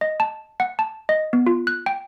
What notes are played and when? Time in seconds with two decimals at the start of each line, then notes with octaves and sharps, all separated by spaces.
0.01 D#5
0.20 A5
0.60 F#5
0.79 A5
1.09 D#5
1.33 B3
1.46 F4
1.67 F#6
1.86 G5